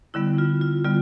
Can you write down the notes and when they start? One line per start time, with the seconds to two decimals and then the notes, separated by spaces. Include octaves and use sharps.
0.14 D3 G3 B3 E4
0.38 F4
0.61 F4
0.85 D3 G3 B3 F4